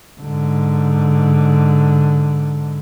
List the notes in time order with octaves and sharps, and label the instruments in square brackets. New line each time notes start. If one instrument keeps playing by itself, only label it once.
[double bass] G#2 D3